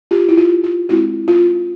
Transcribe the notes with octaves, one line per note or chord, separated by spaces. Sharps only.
F4 G4
E4
F4
F4
G#3 C4 E4 F#4
F4